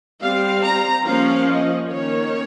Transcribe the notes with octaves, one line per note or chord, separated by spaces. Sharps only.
G3 C4 F5
A#5
F3 A#3 C#4 F5
D#5
D#3 A#3 C#4 C#5